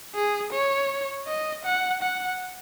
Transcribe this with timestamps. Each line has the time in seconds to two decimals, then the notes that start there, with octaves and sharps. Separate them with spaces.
0.15 G#4
0.52 C#5
1.27 D#5
1.65 F#5
2.02 F#5